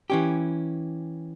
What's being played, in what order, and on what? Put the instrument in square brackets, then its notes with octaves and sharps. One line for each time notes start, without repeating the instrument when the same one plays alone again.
[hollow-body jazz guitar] E3 C#4 G4